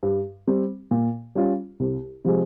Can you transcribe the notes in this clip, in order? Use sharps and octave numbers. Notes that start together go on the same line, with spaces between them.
G2
G3 C4
A#2
G3 C#4 F4
C2
C3 F3 G#3